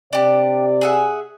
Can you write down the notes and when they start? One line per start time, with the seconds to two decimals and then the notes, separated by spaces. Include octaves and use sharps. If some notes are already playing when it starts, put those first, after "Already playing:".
0.13 C3 D4 G4 D5
0.81 G#4 E5 F#5